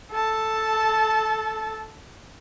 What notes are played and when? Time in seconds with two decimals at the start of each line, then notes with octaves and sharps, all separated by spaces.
0.11 A4 A5